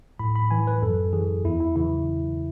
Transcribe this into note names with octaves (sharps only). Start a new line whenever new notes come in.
A2 B5
B5
E3 G#5
B4
F#2 A4
E3 G#4
E2 E4
E4
C#3 E3 E4